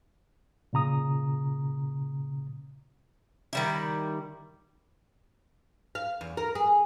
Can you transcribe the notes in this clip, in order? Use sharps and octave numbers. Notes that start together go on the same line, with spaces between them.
A#2 C#3 A#5 D#6
D#3 G3 E4
F5
E2
A#4
G#4